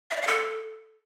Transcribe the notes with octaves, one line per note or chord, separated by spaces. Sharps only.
E5
D5
F5
A4